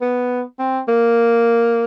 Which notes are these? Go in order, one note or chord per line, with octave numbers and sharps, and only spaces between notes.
B3
C4
A#3